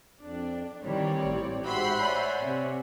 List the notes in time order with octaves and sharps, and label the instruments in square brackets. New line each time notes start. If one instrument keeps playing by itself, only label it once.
[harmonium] F2 [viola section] D4
[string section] D#3 E3 [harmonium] G3 [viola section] C4 C#5 D5
[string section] A1
[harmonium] G#2 F#4 G4 [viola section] C5 E5 F#5 [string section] B5 C6
[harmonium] C#5 D5 G#5
[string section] C3